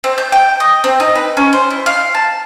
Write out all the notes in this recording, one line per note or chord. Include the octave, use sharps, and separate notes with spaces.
C4
G6
G5
D#5
C4
D#4
B4
C#4
C5
E4
F5
A5